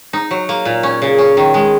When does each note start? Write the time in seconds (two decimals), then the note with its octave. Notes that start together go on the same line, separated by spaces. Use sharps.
0.13 D#4
0.31 F#3
0.49 A#3
0.65 A#2
0.83 C#4
1.02 C#3
1.18 C#4
1.37 D#3
1.54 G#3